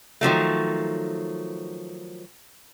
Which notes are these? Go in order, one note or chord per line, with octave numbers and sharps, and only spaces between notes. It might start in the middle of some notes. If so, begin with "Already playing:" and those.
D#3 F3 F#3 A3